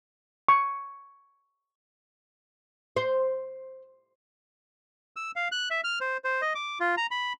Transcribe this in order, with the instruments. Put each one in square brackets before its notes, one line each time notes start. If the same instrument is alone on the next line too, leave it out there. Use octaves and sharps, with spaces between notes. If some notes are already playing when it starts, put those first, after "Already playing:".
[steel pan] C#6
[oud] C5
[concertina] E6
F5
F#6
E5
F6
C5
C5
D#5
D6
F4
A#5
B5